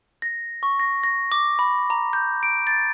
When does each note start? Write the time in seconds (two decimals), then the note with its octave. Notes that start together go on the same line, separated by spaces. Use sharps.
0.22 A#6
0.63 C#6
0.80 A#6
1.03 A#6
1.32 D6
1.59 B5
1.90 A#5
2.13 G6
2.43 D7
2.67 A6